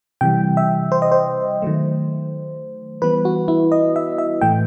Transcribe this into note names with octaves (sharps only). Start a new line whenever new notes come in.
C3 E3 G3 G5
E5
C5
D#5
C5
D#3 F#3 A3
E3 G3 B3 B4
F#4
E4
D#5
E5
E5
A2 E3 A3 G5